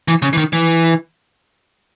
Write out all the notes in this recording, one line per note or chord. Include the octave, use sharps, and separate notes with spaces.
E3
C#3
E3
D#3
E3